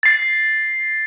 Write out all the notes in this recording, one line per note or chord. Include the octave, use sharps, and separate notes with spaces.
A6 C7